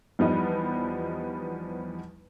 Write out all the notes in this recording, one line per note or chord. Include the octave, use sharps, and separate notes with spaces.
E2 F3 G3 B3 D#4 B4